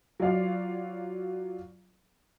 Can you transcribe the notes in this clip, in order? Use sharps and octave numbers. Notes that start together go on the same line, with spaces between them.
F#3 F4 C5 D5 F5